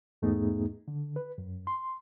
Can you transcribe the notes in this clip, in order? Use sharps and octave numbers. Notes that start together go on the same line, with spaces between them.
E2 G#2 A3 B3 D#4 G#4
D3
B4
F#2
C6